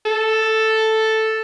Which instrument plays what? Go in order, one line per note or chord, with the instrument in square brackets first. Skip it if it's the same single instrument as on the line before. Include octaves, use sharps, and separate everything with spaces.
[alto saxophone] A4